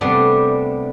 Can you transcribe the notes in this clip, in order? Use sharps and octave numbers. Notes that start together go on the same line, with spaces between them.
C3 G3 A3 B3 D4